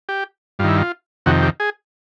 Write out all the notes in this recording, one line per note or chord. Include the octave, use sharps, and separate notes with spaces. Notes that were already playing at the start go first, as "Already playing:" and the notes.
G4
G2 D#3 E4 F4
F4
F2 C3 D#3 F#4
G4
G#4